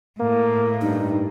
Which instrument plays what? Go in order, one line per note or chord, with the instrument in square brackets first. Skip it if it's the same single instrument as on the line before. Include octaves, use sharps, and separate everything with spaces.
[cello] A2 [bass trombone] A#3
[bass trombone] G2 [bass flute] D#4